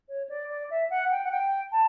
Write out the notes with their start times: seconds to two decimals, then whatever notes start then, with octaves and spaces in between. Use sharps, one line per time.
0.09 C#5
0.29 D5
0.50 D5
0.70 E5
0.90 F#5
1.11 G5
1.24 F#5
1.31 G5
1.72 A5